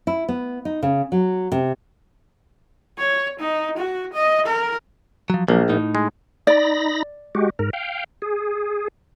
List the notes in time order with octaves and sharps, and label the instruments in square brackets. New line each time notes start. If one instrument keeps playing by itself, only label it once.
[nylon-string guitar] E4
B3
D#4
C#3
F#3
C3
[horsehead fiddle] C#5
D#4
F#4
D#5
A#4
[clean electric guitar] F3 F#3
[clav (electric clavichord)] A#1 [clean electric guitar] F3 F#3 A#3
[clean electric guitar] A2 D#4
[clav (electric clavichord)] G#3
[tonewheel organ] D#4 B5 A#6 [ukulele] D5
[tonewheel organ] G#3 F#4 G4
G#2 A#4
F5 G5
G#4